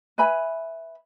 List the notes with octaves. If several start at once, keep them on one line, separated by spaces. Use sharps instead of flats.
B4 E5 G#5 B5